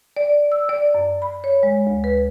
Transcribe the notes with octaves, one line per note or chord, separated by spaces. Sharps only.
D5
E6
D5
F#2
B5
C#5
G#3
D2
B4